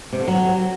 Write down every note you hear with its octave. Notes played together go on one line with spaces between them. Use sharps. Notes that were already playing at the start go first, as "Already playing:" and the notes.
C3
D3
F#3